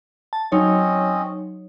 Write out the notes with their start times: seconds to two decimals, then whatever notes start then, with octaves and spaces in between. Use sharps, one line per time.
0.33 A5
0.52 F#3 C4 C#4 D#4 C#5 D#5